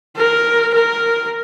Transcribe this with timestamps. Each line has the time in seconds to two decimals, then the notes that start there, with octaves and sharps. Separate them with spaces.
0.17 A#4
0.75 A#4